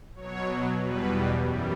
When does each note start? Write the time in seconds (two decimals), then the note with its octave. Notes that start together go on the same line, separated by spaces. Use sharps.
0.16 B2 F#3 C#5
0.78 E2 B2 G3 B4
1.40 F#2 E3 G3